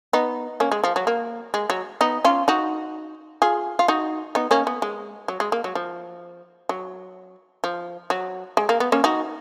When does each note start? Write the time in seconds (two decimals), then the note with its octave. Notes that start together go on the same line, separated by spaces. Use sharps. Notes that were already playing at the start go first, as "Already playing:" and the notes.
0.13 B3 D#4
0.60 A#3 C#4
0.72 G#3
0.84 F3
0.96 F#3
1.07 A#3
1.54 G#3
1.70 F#3
2.01 B3 D#4
2.25 C#4 F4
2.48 D#4 F#4
3.42 F4 G#4
3.79 F4
3.88 D#4 F#4
4.35 B3 D#4
4.51 A#3 C#4
4.67 B3
4.82 G#3
5.28 F#3
5.40 G#3
5.52 A#3
5.64 F#3
5.75 F3
6.69 F#3
7.64 F3
8.10 F#3
8.57 G#3
8.69 A#3
8.80 B3
8.92 A#3 C#4
9.04 D#4 F#4